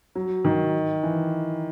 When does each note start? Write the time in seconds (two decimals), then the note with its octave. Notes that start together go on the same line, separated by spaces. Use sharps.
0.15 F#3
0.45 D#3
1.03 E3